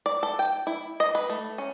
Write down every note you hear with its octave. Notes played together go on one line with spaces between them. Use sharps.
D5
A4
G5
E4
D#5
B4
A3
C#4